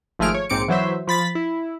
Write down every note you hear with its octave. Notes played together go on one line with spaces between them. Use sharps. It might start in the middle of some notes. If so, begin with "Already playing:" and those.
G#1 F3 A3 G#4 F6 D7
C#5
A#1 G#2 C4 D6 C#7 D7
E3 F#3 C5 E5
F3 B5 A6 B6
E4